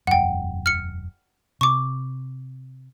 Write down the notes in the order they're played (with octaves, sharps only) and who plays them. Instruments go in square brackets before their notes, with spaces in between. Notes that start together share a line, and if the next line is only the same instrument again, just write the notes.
[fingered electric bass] E1 F#2 [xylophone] F#5 G5
[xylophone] F6 C#7
[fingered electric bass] C3 [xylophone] C#6 D6